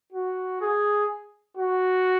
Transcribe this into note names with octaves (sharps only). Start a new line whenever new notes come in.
F#4
G#4
F#4